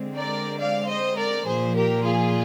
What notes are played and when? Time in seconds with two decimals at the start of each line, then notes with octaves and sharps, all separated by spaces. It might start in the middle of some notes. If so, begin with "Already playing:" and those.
Already playing: D3 G#3 C4
0.16 A#4 D5
0.59 D5 F5
0.88 C5 D#5
1.17 A#4 D5
1.46 A#2 F3 A#3 G#4 C5
1.75 G4 A#4
2.04 F4 G#4